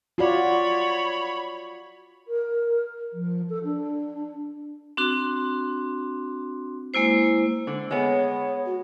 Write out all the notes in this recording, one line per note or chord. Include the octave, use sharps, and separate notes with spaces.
F4 F#4 C#5 D5 B5
A#4
F3
A4
D4
C4 D4 F#4 C6
G#3 A#3 E4 C5
D3
G#3 B3 C#5
F#4